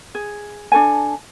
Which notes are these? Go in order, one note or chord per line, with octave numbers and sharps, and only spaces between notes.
G#4
D4 F#4 A4 G#5